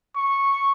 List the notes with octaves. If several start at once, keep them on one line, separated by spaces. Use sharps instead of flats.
C#6